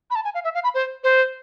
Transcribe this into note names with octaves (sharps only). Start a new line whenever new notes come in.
B5
A5
G#5
F5
E5
F5
B5
C5
C5